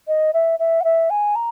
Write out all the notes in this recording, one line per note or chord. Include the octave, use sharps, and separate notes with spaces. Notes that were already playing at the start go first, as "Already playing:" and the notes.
D#5
E5
E5
F#5
E5
G#5
A#5